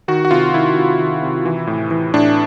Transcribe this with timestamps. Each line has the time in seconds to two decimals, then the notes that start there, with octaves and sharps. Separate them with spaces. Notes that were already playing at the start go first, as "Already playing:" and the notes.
0.08 D#3 F#4
0.25 F#4
0.31 C3 F4
0.54 D#3 E4
0.76 C3
0.99 D#3
1.22 C3
1.45 E3
1.67 A2
1.91 E3
2.14 A2 D4